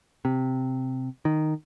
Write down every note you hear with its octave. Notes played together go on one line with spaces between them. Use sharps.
C3
D#3